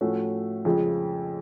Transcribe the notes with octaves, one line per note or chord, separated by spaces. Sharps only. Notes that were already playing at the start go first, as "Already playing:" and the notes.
A2 F3 A3 C#4 F#4
F2 C#3 F3 G#3